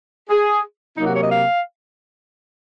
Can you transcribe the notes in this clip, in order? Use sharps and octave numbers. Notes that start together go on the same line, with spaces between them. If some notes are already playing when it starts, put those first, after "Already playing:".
G#4
C3 F#3 A#3 D#4
F#4
C#5
D#5
F5